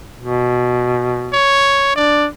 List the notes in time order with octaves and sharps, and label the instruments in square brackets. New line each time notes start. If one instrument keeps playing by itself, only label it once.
[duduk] B2
[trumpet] C#5
[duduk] D4 [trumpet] D5